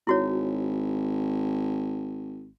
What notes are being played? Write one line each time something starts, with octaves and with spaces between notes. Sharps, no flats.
G#1 E4 F#4 C#5